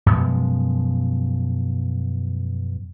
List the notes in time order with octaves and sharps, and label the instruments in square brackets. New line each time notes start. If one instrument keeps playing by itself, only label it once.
[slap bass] F#2 B2 F3 G#3